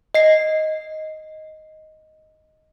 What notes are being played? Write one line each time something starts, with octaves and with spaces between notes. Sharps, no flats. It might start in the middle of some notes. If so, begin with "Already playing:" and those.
D#5 C7